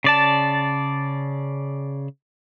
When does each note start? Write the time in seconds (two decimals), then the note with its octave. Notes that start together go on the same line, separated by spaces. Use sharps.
0.04 C#3 D5 A5